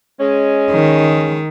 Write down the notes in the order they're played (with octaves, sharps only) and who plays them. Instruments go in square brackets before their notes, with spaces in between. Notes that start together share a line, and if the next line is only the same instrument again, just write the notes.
[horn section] G#3 C#4
[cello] D#3